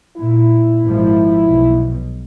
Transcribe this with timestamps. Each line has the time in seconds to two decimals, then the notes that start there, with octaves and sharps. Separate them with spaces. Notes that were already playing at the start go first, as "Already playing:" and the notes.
0.18 A#2 E4
0.84 G#1 F3
1.46 B1 B2